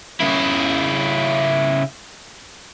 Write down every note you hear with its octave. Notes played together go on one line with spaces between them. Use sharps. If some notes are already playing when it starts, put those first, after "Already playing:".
C#3 E4